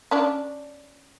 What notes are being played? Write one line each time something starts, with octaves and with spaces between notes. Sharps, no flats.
C#4 D4 D5